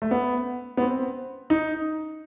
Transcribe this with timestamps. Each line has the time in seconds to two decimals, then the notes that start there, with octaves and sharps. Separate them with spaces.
0.02 A3
0.11 B3
0.77 B3
0.81 C4
1.50 D#4